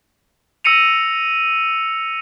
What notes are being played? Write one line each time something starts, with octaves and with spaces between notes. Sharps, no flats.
E6 A#6 C#7 D#7 F7